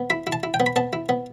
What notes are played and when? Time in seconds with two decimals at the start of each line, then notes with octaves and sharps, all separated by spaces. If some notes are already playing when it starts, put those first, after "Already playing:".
Already playing: B3
0.10 E4 B5
0.27 E4
0.32 A5
0.43 E4
0.54 G5
0.60 B3
0.66 B5
0.76 B3 A5
0.93 E4
1.09 B3